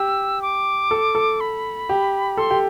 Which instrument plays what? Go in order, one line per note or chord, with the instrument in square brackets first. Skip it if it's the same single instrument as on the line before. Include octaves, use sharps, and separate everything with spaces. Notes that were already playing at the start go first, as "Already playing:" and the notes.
Already playing: [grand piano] G4 [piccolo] E6
[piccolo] D6
[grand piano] A4
A4
[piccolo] B5
[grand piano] G4
[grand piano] A4 [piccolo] C6
[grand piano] G4